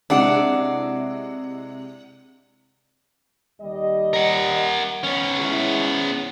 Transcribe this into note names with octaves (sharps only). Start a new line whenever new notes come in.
C3 G#3 D4 E4 F#5
D#2 G3 D#5
A#4 F#5
B3 C#4
G#3 E4 G#4